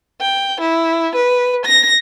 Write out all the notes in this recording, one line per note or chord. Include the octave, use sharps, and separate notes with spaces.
G5
E4
B4
A#6